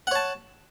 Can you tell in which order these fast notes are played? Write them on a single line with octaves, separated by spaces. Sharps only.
F#5 C#5 A5